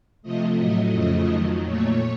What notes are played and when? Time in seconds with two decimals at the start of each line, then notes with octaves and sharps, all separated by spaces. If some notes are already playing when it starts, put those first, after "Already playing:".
0.22 C3 F3 A3 D#5
0.57 A2 F#3 A3 D#5
0.92 F2 C#3 F3 A3
1.27 F2 D#3 F#3
1.63 A#2 A3 C#5